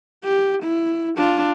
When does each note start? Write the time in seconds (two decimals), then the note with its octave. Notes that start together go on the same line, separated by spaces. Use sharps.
0.24 G4
0.63 E4
1.17 D4 F4